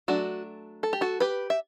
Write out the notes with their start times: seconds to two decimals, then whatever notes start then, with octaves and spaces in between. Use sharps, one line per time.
0.08 F#3 A3 D4 F#4
0.83 A4
0.93 G4
1.01 F#4 A4
1.20 G4 B4
1.50 E5